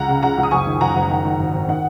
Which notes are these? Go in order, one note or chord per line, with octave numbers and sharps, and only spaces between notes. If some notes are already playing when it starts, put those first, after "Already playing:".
Already playing: C#2 F#5 A#5
C#3
C#3 F#5 A#5
C#2
D#6
F#1 G#5 C#6
D#3
F#1 F#5 A#5
F#1
D#3
D#3
G#1
G#1
D#3 F#5